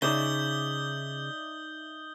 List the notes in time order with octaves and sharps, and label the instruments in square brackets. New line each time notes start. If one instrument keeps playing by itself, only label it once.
[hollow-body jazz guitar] C#3 [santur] D#4 D5 E5 [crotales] D#6 G6 G7